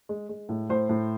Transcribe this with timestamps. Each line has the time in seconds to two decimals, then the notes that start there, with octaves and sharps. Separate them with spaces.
0.09 G#3
0.29 G#3
0.49 A2
0.69 A2 C5
0.89 A2